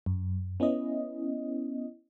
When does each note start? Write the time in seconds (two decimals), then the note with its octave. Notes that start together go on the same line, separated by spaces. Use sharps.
0.06 F#2
0.60 B3 C#4 E4 D#5